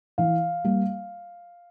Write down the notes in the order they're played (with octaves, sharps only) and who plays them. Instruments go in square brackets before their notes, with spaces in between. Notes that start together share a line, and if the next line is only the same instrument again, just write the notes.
[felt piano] E3 [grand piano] F5
[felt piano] G3 A#3